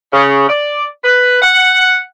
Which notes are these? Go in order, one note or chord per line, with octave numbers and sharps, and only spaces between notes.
C#3
D5
B4
F#5